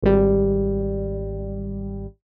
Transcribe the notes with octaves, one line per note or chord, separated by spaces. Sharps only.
G#1 G3